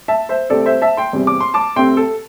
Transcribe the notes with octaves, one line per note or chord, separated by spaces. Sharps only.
E5 A5
C5 E5
C2 C3 A3 C4 A4 D5
C5 E5
E5 A5
G5 C6
E2 C3 G3 C4
D6
C6
A5 D6
C2 C3 A3 C4 G5 C6
A4